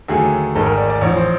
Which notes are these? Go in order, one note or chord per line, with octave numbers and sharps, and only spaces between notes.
D#2 D3 F#3 A3 G#4
G#1 G#2 D#3 G#3 A4
A#4
D5
D5
A1 G#2 F3 C#5
C5